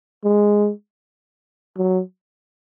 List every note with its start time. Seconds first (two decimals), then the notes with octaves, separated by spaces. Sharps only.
0.24 G#3
1.77 F#3